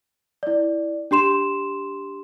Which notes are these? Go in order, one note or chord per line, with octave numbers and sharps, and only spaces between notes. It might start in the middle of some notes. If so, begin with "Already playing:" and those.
E4 D5
D4 G4 C6 E7